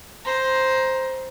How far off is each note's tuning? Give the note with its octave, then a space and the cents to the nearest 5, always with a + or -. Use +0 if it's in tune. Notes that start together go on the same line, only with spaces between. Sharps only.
C5 +0 A#5 +15